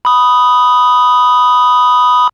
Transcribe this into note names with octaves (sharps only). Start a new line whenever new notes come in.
B5 D#6